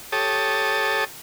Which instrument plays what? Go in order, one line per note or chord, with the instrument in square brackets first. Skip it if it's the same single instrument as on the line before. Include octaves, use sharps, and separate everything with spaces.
[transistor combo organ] G4 A4 C#5 A5 D#6